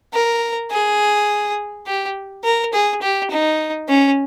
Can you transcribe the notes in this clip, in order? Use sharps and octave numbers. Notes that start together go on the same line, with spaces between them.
A#4
G#4
G4
A#4
G#4
G4
D#4
C#4